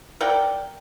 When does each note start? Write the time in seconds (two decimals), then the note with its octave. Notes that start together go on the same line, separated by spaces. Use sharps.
0.20 A#4 D5 F#5 G5